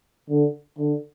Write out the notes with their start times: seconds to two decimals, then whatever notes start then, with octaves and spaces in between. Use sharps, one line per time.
0.29 D3
0.78 D3